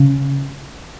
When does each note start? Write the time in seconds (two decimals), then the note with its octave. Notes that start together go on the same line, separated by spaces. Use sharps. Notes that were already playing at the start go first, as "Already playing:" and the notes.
Already playing: C#3